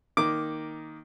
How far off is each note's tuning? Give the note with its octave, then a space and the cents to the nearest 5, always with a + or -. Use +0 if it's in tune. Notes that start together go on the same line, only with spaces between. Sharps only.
D#3 +0 A#3 +0 D6 +0